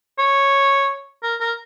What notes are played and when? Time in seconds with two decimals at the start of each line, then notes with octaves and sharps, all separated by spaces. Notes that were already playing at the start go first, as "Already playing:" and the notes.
0.19 C#5
1.23 A#4
1.41 A#4